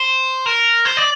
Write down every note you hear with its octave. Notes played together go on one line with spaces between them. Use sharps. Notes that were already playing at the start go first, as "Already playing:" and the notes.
Already playing: C5
A#4
C5
D5